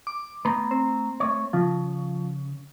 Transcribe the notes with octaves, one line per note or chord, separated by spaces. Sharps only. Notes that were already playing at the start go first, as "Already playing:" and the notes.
D6
A3 B3 A#5
C4
A3 C#5
C#3 F3